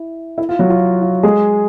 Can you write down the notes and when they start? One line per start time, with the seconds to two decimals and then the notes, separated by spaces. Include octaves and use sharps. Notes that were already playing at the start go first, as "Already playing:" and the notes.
Already playing: E4
0.38 E4
0.49 F4
0.59 F#3 F#4
0.70 F4
1.02 F4
1.23 G#3 G#4